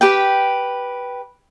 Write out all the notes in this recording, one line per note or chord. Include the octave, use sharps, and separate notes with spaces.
G4 B4 G5